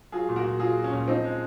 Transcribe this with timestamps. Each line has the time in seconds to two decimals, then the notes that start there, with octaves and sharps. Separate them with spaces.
0.12 F#3 F4 G#4
0.29 A#2
0.36 F#4 A#4
0.44 A#2
0.60 F#3 F4 G#4
0.76 F#3
0.84 C#4
0.92 A#2
1.08 F3 C4 D#4
1.24 G#3